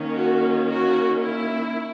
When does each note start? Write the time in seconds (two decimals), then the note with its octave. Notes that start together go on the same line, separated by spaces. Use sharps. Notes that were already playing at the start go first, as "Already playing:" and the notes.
Already playing: D#3 A#3 C#4
0.15 F#4
0.68 F#4
1.22 E4